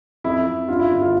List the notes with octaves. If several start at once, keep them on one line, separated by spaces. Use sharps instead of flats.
F2 E4
F2
G2 F4
E4
G1 E4
F4